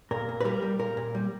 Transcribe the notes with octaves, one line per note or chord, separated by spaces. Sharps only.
A#2 A#4
A#2
B4
G3 A#4
G3
A#2 A#4
A#2
G3